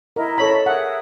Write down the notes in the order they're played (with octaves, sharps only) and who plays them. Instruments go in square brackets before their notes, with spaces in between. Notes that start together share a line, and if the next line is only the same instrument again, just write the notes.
[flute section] E4 D#5 [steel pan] A#4
[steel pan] A4 C#5 B5
[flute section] G#4 A#4 E5 [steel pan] F#5